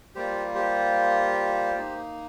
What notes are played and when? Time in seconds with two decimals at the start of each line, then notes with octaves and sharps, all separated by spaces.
0.15 G3 A#3 F4 G4 C5
0.55 G4 C5
1.75 A#3 D#4